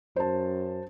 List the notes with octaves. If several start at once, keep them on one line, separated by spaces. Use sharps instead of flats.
F#2 C5 A5